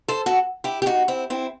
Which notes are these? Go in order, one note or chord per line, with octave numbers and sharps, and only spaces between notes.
A4 C5
F#4 A4
E4 G4
G4
D#4 F#4
C4 E4
C4 E4